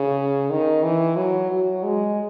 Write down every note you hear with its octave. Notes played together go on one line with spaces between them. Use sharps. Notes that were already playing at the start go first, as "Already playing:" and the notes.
Already playing: C#3
D#3
E3
F#3
F#3
G#3